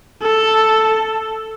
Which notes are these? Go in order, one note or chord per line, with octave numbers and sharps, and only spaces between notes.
A4